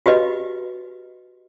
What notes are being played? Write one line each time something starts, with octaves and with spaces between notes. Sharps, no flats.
F#4 G4 B4 D#5